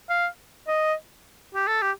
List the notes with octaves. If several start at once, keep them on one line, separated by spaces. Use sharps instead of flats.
F5
D#5
G4
A4
G4